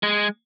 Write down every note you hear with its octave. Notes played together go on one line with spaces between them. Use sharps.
G#3